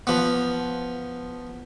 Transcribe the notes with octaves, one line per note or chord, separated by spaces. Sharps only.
F3 B3